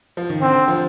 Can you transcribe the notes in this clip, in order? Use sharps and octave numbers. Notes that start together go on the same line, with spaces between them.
F3
D#3
D3 C4
F3